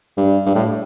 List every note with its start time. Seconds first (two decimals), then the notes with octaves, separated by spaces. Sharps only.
0.17 G2
0.46 G2
0.55 A2